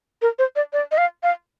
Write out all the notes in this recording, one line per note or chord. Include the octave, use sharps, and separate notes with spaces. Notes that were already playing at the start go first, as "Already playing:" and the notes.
A#4
C5
D5
D5
D#5
F5
F5